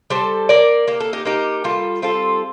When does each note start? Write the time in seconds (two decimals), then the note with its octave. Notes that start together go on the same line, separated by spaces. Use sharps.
0.10 G3 A4 C5
0.49 A#3 A#4 D5
0.88 A#3 G4
1.00 A4
1.13 D#4 G4
1.25 A#3 D#4 G4
1.64 G3 F4 A4
2.02 C4 F4 A4